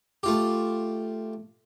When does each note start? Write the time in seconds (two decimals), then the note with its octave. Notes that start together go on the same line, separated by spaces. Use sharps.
0.23 A3 F4 G4